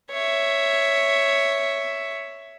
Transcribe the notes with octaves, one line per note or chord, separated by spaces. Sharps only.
C#5 E5